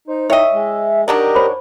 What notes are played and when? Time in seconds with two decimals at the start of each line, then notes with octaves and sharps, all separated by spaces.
0.07 D#4 C5
0.30 E4 C#5 D#5 E5 G5
0.53 G#3
1.08 D#3 F#3 D4 G4 A#4 D#5
1.35 C5 C#5 B5